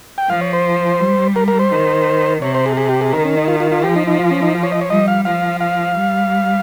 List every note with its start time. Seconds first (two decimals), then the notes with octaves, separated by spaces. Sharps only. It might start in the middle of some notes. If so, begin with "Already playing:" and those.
0.18 G5
0.30 F3 F5
0.41 C#5
0.53 C5
1.00 G3
1.36 A#4
1.48 A#4
1.59 C5
1.72 D#3
2.42 C3 C#5
2.55 C5
2.66 G#4
2.77 G#4
2.89 G4
3.01 G#4
3.13 D#3 A#4
3.25 C#4
3.37 D#4
3.48 F4
3.60 F4
3.72 F4
3.84 F3 G4
3.96 D#4
4.07 D#4
4.19 F4
4.31 C#4
4.43 D#4
4.55 F4
4.63 C#5
4.72 D#5
4.81 C#5
4.90 G3 D#5
5.08 F5
5.25 F3 F5
5.61 F5
5.96 G3